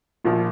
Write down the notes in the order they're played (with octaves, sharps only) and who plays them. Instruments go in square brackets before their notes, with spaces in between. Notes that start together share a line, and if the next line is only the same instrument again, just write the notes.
[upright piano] A#1 A#2 F3